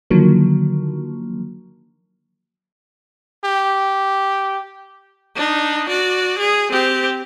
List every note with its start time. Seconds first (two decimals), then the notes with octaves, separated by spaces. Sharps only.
0.11 D3 D#3 F3 F#3 A#3
3.45 G4
5.36 D4 D#4
5.89 F#4 D5
6.39 G#4
6.71 C4 G4